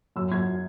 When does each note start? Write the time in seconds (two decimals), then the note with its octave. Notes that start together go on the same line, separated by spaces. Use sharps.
0.16 F#2 E6
0.31 F#2 G#6